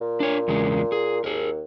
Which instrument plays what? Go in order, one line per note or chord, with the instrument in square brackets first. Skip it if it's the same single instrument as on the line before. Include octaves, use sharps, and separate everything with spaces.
[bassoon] A#2
[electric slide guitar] D4 C#5
E2 C#3 G#3
G#4
[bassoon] D#2 [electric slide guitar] G#4 A#4